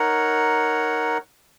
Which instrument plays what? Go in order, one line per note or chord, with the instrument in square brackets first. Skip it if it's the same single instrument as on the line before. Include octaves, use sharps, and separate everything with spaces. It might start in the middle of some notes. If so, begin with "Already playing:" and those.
Already playing: [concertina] D#4 A#4 C#5 F#5